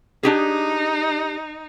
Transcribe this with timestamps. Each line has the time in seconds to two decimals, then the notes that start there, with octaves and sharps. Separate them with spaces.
0.23 D4 D#4 G4 G#4